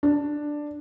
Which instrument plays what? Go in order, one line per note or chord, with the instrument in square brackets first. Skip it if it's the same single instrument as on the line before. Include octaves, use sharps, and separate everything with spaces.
[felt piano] D4